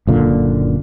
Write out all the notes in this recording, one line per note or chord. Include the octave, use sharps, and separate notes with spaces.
F#1 A#2 D3